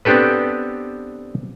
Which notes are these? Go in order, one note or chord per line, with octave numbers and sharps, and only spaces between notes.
B3 C4 D4 G4 A4 B4